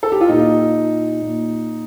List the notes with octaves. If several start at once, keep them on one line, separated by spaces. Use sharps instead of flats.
A4
G4
F4
A#2 D#4
A#2